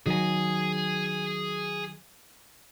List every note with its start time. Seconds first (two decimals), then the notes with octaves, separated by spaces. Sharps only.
0.06 D#3 F#3 G#4 G#5